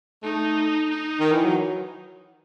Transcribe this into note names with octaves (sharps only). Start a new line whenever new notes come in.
A3 D#4
D#4
D#3
E3
F#3